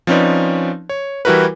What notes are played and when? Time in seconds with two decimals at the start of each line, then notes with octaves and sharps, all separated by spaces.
0.07 F3 C4 C#4 D#4 B4 D5
0.89 C#5
1.25 E3 G3 E4 F#4 A#4 B4